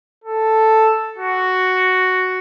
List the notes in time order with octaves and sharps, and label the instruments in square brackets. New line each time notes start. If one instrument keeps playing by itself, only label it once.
[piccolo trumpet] A4
F#4